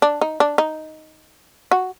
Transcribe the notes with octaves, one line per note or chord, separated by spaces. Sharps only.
D4
D#4
D4
D#4
F#4